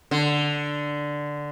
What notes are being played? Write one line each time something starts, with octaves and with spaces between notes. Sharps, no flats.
D3